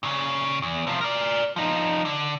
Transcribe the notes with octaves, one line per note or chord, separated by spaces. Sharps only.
A#2 C#3
E2
C3 F3
A#4 D5
F3 D#4
D3